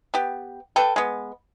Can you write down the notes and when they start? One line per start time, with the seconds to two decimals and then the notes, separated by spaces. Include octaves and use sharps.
0.14 B3 G4
0.76 A4 B4 G5
0.96 G#3 B3